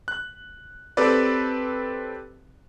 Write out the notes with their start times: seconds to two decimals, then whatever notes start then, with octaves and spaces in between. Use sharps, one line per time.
0.08 F#6
0.97 C4 G4 A4 B4 D5